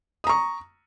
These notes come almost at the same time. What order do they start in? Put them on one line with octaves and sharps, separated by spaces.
D#6 A#5 C#6